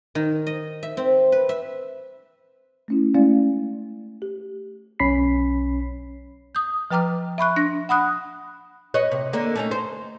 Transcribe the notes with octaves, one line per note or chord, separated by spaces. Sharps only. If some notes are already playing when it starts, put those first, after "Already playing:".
D#3
D#5
E5
C4
B4
E5
A3 C#4 E4
G#3 A3 C#4 E4 D5 F5
G4
B1 C#4 C#5 B5 B6 C7
D#6 G6
F3 B4 G5 A#5 D6 F6
E5 B5 C#6 F#6
D4 A#6
F#5 B5 D#6 F#6
B4 C#5 D#5
C3
D3 A#3
A3 C#4 D#4
C5